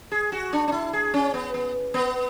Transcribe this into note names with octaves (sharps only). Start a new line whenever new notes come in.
G#4
F#4
D4
D4
E4
G#4
C#4
B3
B3
B3